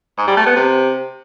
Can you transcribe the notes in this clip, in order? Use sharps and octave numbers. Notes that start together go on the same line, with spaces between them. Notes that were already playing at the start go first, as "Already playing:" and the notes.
G#2
G3
A3
B3
C3